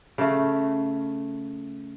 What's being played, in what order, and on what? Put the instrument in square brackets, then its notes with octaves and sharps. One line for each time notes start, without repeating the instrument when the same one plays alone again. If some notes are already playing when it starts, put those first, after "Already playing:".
[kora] C#3 A3